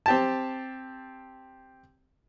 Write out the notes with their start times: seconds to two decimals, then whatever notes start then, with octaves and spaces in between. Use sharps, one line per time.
0.06 C4 G4 A5